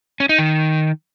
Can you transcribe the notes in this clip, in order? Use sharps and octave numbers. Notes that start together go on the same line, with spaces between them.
C#4
D#4
D#3